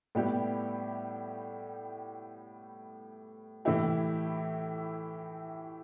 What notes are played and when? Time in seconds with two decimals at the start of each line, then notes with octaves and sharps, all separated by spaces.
0.15 A2 G3 B3 E4 G4
3.65 A2 E3 A3 E4 G4